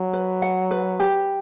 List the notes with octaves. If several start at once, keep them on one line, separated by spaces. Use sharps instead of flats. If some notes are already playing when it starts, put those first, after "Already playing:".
Already playing: F#3
B4
F#5
B4
G4